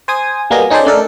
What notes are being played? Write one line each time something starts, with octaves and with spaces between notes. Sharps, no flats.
C5 G#5 D#6
G3 A#3 B3 F#4 G#4 D#5
C#4 D#4 G#4 A4 C5 D5
A3 D4 A4 A#4